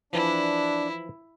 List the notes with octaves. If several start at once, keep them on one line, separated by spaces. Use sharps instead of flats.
E3 F3 D4 E4